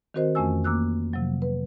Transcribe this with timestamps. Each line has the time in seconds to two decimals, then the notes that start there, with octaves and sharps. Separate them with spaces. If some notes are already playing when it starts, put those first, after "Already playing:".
0.14 D#3 C4 F#4 A#4 C5 D#5
0.35 F2 E3 A3 C#4 G#5 E6
0.64 A#3 D6 E6 F#6
1.13 C3 F3 F#3
1.42 B4